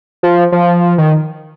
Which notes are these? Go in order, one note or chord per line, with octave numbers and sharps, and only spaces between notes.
F3
F3
D#3